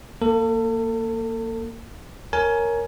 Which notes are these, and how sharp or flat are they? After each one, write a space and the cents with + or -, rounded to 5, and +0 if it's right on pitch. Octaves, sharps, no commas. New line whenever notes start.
A#3 -15 A4 +35
A#4 +0 C#5 +0 G#5 +20